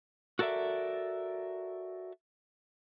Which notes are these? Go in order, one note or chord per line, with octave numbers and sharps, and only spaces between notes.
F#4 A4 A#4 D5 E5